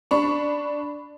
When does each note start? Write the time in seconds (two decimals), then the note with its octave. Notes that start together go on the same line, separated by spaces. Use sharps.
0.11 D4 B5 C#6